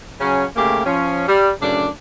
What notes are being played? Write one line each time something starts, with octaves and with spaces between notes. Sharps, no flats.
C#3 F#3 C#4
C#3 A3 A#3 G4
F3 C#4
G3
F#2 A2 C#3 D4